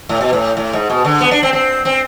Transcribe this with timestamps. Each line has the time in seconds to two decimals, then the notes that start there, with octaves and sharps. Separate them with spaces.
0.09 A2
0.21 B2
0.33 A2
0.57 A2
0.73 G#2
0.90 B2
1.05 D3
1.21 B3
1.31 D4
1.43 C4
1.53 C4
1.85 C4